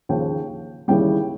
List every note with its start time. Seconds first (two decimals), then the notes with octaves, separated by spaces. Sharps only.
0.09 D#2 C#3 F3 G5
0.88 D#2 C#3 E3 G3 G5